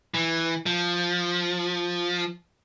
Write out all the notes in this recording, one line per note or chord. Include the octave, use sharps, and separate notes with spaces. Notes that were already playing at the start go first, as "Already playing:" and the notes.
E3
F3